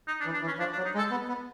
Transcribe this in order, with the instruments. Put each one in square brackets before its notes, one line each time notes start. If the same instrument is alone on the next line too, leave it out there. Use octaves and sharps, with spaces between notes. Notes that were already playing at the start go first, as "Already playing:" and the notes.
[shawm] D#4
D4
[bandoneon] E3
[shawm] D4
[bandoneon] E3
[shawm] C#4
[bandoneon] F3 [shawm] D4
[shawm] D4
[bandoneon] F#3
[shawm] D#4
[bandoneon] G#3
[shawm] A4
[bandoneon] B3
B3